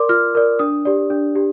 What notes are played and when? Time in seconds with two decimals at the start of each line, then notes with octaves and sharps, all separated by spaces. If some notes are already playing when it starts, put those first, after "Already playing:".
Already playing: A#4 D5 C6 D6
0.09 F4 F6
0.35 A#4 D5
0.59 D4 D#6
0.85 G4 D5
1.10 D4
1.35 G4